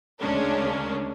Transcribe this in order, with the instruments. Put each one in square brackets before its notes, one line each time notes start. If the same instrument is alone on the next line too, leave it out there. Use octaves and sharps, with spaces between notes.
[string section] D2 C#3 G#3 C#4 D4 A#4